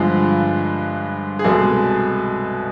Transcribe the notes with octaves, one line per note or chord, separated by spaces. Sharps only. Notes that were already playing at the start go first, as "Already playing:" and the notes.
Already playing: G2 D3 F3 G#3
G#4
C2 B2 G#3 A4